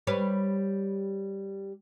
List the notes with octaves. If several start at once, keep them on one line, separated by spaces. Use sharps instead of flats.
G3 B4 C#5